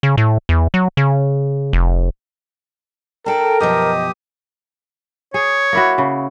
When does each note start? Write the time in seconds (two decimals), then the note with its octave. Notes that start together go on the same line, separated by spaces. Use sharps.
0.03 C#3
0.17 A2
0.49 E2
0.74 F#3
0.97 C#3
1.73 F1
3.26 D4 A4 A#4 G5
3.60 F#2 B2 F3 G4 D#5 D#6
5.34 G#4 C#5
5.73 A#3 E4 F#4
5.98 C#3